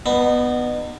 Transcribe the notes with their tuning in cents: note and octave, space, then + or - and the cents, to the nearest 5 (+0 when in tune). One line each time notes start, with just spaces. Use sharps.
B3 +0 D#4 -40